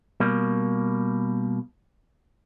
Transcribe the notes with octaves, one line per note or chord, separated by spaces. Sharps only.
B2 G3 A#3